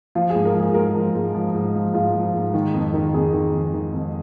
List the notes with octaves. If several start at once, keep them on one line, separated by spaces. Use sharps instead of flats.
F3 F4
G#4
G#2
A#4
F3 G#4
G#2 A#4
F3
G#2
F3
G#2
F3
G#2 F4
F3
G#2
D#3
F2
D#3
F2 G#4
D#3
F2
D#3
F2